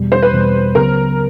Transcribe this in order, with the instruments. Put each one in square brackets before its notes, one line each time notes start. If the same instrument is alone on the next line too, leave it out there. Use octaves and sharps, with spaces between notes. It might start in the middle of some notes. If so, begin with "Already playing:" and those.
Already playing: [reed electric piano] E2 B2 G3
[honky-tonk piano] C5
B4
[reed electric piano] E2 B2 G3
[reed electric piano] C#2 C#3 F#3 B3 [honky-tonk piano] A#4